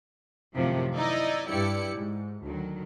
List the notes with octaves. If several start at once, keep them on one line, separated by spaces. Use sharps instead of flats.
F#2 A2 C3 D#3 F3
D#4 E4 D5 D#5
G2 E4 G4 D5 C#7
G#2
D2 D#3 F#3